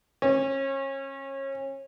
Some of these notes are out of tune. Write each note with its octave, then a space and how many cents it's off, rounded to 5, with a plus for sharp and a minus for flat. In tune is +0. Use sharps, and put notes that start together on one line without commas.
C#4 -30